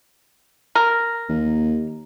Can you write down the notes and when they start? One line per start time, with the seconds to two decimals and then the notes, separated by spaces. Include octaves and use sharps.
0.75 A#4
1.29 D#2